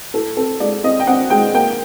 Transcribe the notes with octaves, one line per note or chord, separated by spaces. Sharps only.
A2 A4
C4 A4
G#3 D5
C4 D#5
G5
C4 F#5
G#3 G5
A#3 G5